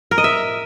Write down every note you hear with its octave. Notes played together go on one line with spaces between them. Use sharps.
A#4
D#5
E5